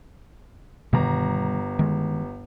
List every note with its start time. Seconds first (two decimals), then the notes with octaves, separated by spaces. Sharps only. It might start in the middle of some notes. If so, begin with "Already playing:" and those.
0.93 G1 B2 D#3 G3 A#5
1.79 D#3 G#3